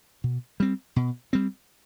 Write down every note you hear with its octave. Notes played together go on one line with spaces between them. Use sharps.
B2
G3 C4
B2
G3 C4